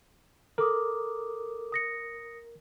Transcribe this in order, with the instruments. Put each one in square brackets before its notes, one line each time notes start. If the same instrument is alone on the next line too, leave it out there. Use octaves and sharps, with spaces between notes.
[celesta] A4 D6 D#6 [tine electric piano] A#4
[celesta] D#6 A#6 C#7